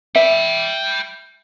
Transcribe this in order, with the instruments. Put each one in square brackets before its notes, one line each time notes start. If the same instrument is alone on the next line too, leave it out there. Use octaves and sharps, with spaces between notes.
[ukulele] E5 [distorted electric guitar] G5 B5